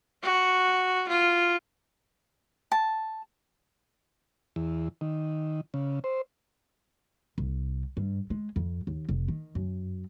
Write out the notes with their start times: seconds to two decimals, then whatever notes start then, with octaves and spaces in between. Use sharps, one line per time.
0.23 F#4
1.08 F4
2.72 A5
4.56 E2
5.01 D#3
5.74 C#3
6.04 C5
7.38 C2
7.97 G2
8.30 G#3
8.56 F2
8.87 D#2
9.09 F1
9.28 D#3
9.55 F#2